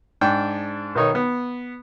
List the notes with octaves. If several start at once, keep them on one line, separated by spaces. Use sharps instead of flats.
G#2 D4 G5
B1 D#3 D#4 C#5
B3